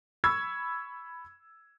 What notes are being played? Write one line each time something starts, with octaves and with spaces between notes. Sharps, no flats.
B5 C#6 E6 G#6